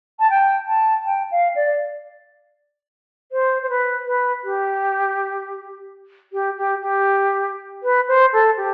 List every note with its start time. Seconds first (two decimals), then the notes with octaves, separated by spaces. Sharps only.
0.19 A5
0.30 G5
0.67 A5
1.05 G5
1.31 F5
1.55 D5
3.32 C5
3.62 C5
3.69 B4
4.06 B4
4.44 G4
6.32 G4
6.57 G4
6.81 G4
7.83 B4
8.08 C5
8.33 A4
8.57 G4